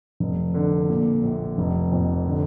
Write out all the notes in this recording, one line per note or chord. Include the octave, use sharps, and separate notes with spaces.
F1
D3
A#2
A#1
F1
F2
D3